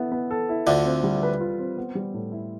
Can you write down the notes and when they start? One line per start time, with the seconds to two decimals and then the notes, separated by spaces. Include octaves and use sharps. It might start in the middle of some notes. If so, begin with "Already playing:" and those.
Already playing: B3 E4 A4
0.12 B3
0.31 A4
0.49 E4
0.67 D2 D3 F4
0.85 C4
1.04 G3
1.23 B4
1.41 F4
1.59 C4
1.77 B3
1.95 G3
2.14 A2
2.32 E4